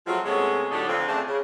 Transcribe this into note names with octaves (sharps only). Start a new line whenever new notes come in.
F3 F#3 G#3 A3 C4
C3 G#3 A3 B3 C#4
A2 D3 F#3 D4 D#4 G4
F2 D3 C4
C#3 A3 C4 D4
C#3